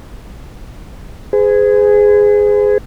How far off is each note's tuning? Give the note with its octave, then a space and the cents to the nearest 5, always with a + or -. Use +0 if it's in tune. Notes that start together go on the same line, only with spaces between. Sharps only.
G#4 +0 C5 -45